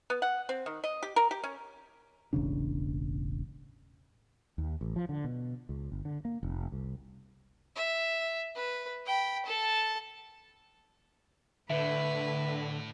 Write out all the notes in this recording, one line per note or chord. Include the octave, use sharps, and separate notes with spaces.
B3
F#5
C4
D#3
D#5
G4
A#4
G4
C#4
E1 A1 C#3 D4
D#2
A1
F3
D3
B2
C#2
G1
D3
A#3
F1
C2
E5
B4
G5 B5
A4 A5
A2 D3 B4 E5